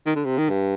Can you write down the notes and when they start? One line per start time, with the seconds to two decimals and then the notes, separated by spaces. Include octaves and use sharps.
0.06 D#3
0.16 D3
0.25 C3
0.38 D#3
0.50 G2